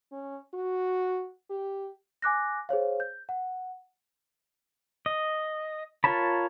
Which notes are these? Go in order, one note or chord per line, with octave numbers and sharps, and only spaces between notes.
C#4
F#4
G4
G#5 D6 F#6 A#6
G#4 C5 C#5 F5
G6
F#5
D#5
F4 A#4 C#5 A5 B5